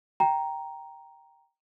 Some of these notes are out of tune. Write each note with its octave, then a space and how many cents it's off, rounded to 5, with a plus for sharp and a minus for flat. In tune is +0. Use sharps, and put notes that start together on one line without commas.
G5 +0 A#5 +0